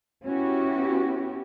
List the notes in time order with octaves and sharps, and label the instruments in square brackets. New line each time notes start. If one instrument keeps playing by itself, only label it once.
[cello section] B3 C#4 E4 F#4 G4